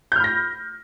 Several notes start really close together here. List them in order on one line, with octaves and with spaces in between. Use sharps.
G6 F6 B5 A#6